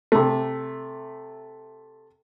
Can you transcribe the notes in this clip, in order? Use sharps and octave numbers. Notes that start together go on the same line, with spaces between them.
C3 A3